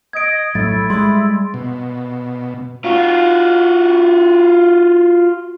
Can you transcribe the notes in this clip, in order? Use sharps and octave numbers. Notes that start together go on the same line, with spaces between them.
D#5 G#6 D7
A#1 A2 F#3 A3 E4 A6
G3 G#3 C6
B2
F4 F#4